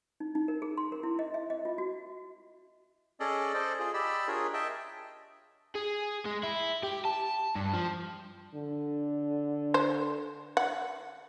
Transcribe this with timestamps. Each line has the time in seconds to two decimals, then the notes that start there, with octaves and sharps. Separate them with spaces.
0.20 D#4
0.35 D#4
0.48 A#4
0.62 G#4
0.77 C6
0.92 A#4
1.03 E4
1.19 D#5
1.34 E5
1.50 D#5
1.65 F4
1.78 F#4
3.20 C#4 G#4 A4 D5 D#5
3.54 A4 C5 D5 D#5
3.79 F4 G#4
3.94 G4 D5 D#5 B5 E6
4.27 D4 F4 G#4 A#4 C#5
4.54 D#5 E5 G5 A5
5.75 G#4
6.25 G#3
6.43 E4
6.83 G4
7.05 A5
7.55 G2
7.73 F3
8.54 D3
9.74 C5
10.57 F#5